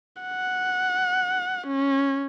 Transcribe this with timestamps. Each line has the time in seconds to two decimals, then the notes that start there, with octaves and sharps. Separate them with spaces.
0.22 F#5
1.67 C#4